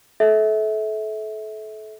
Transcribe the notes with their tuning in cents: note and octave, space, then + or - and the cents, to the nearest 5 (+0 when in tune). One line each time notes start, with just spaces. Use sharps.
A4 -30 E5 -25